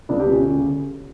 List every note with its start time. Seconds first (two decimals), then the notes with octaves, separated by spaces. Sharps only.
0.09 C#2 D4
0.20 G4
0.26 B2
0.31 C#4
0.42 D2
0.57 C#3